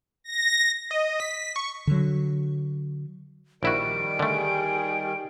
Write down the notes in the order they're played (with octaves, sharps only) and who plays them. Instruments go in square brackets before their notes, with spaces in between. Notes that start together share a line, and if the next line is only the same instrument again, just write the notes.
[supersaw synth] A#6
[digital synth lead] D#5
B6
C#6
[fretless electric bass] D3 F#3
[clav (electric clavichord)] A#1 E4 F#4 [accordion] D#3 G3 [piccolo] D7
[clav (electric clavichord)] D3 A3 [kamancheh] G4 G#4